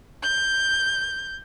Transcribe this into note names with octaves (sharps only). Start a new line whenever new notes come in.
G6